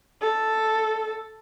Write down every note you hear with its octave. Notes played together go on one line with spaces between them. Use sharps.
A4